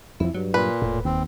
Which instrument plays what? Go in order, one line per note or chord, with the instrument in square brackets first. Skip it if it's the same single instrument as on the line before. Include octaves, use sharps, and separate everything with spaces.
[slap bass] F2 F3 [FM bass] E4
[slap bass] G2 [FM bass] F#3
[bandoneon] A#2 [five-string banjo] B4
[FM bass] E1 [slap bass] A2
[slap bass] D#2 [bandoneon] C4